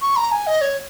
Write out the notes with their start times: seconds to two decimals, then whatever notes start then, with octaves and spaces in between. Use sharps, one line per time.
0.02 C#6
0.16 A#5
0.32 G#5
0.47 D#5
0.61 C#5